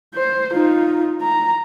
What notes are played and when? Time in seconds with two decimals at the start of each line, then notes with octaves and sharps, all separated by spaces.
0.15 C5
0.53 D#4 F4
1.22 A#5